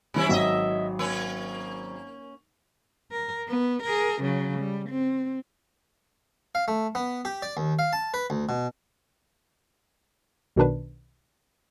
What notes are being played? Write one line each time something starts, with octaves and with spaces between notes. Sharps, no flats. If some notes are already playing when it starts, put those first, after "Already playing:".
G2 C3 E3 C#4 E4
G#1 F#3 D#5 E5
A#3 C#4
A#4
B3
G#4 A#4
C#3 F#3
G3
C4
F5
A3
B3
G4
D5
D#2
F5
A5
B4
D2
B2
B1 B2 D#3 D4 B4